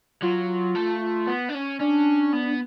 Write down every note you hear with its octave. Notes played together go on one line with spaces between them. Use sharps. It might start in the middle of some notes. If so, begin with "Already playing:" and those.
F#3 F4
A3
B3
D4
C#4
C#4 D4
B3